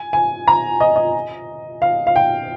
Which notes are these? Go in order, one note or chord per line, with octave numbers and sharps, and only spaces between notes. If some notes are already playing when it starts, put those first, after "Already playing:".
Already playing: G#5
G#5
A#5
D#5
D#5
F5
F5
G5